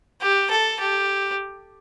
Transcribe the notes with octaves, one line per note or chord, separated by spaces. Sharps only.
G4
A4
G4